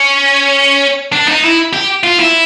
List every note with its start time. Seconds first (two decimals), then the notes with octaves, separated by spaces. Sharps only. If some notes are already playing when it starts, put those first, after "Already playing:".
Already playing: C#4
1.13 D4
1.28 D#4
1.44 E4
1.73 G4
2.03 F4
2.19 E4